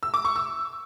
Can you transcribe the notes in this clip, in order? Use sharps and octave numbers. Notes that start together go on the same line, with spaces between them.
E6
D6
C#6
E6